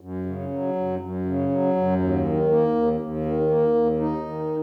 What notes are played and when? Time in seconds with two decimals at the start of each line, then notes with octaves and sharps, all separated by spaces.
0.01 F#2
0.26 C#3
0.51 F#3
0.75 F#2
1.01 F#2
1.26 C#3
1.50 F#3
1.76 F#2
2.00 D#2
2.25 D#3
2.51 A#3
2.75 D#2
3.00 D#2
3.25 D#3
3.50 A#3
3.75 D#2
4.00 D#4
4.25 D#3